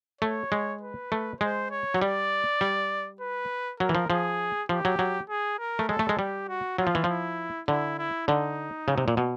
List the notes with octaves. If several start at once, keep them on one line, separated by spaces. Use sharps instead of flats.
A3 C#5
G#3
B4
A3
G#3 C5
C#5
F#3
G3 D5
G3
B4
F#3 A#4
E3
F3
F3 G#4
F3 G4
F#3
F#3
G#4
A#4
A3
G#3 A4
A3
G#3
G3 G4
F#4
F#3 F4
F3
E3
F3 E4
D3 E4
E4
D3 D#4
C#3
C3
A#2
B2